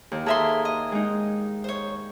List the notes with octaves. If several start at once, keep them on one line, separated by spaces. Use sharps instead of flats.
D#2
G#4 A4 E5 A#5 C6 D#6
D#5
G#3 D#4
C5 C#5